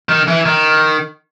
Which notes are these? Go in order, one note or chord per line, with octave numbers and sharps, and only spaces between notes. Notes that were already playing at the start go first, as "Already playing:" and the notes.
D#3
E3
D#3